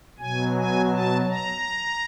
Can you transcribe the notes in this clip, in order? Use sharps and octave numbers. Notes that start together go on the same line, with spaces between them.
B2 F#3 G#5
G#5
A5
A#5